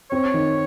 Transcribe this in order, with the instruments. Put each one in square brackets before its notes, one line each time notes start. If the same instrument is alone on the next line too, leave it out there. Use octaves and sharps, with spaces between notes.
[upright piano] C4 [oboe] C#5
[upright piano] D#3